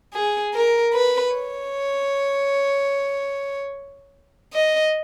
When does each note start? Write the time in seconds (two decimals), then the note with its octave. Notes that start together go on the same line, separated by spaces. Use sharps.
0.13 G#4
0.54 A#4
0.94 B4
1.34 C#5
4.53 D#5